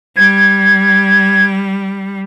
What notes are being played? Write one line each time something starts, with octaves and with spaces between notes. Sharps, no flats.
G3 G#6